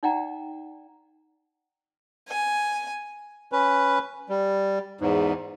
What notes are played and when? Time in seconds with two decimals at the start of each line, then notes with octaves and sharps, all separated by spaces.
0.03 D#4 D5 F#5 G5 A#5
2.29 G#5
3.52 C#4 B4
4.29 G3
5.01 E2 G#2